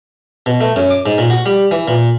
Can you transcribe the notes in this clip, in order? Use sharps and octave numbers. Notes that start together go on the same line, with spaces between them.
B2
A3
F#2
D6
G#2
A#2
F#4
G3
E3
A#2